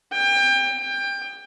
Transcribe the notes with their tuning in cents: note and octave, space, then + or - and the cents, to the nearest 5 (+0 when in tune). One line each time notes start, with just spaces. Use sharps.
G5 +30
G5 +25